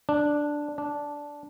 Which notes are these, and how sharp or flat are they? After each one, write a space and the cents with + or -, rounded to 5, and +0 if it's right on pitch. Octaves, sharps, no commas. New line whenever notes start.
D4 +0
D4 -10